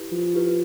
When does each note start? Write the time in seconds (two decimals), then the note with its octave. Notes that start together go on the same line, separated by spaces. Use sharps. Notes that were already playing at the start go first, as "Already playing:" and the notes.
Already playing: E4 G4 B4
0.12 F3
0.33 E4 G4 B4